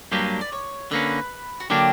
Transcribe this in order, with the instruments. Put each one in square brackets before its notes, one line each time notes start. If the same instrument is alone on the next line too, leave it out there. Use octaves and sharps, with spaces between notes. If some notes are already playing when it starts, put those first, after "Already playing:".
[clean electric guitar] G2 F#3 A#3 D4 G4 [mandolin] B4
[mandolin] D5
C#5
[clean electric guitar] D3 A#3 C#4 [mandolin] B4
[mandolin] F#4
[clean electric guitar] D3 F#3 A#3 D4 [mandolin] G4